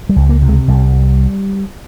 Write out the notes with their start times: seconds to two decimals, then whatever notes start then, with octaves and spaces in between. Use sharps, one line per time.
0.09 G3
0.16 C#2
0.29 A#3
0.42 C3
0.49 G#3
0.68 C2 G3